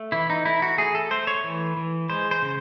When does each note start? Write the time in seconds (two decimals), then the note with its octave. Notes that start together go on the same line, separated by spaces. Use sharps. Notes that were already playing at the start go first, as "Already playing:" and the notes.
Already playing: A3
0.12 E3 E4
0.30 D#4
0.45 A3 E4
0.62 F#4
0.78 A3 G#4
0.95 A4
1.11 A3 C5
1.27 C#5
1.44 E3
1.77 E3
2.10 G#3 C5
2.31 C5
2.42 C#3